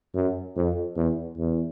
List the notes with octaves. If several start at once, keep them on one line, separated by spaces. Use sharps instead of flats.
F#2
F2
E2
E2